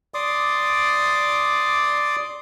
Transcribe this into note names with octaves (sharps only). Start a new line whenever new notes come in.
D5 C6 D6 D#6